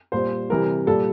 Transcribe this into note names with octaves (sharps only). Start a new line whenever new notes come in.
A#2 G3 C5
C3 E3 G3 A#4
A#2 G3 A4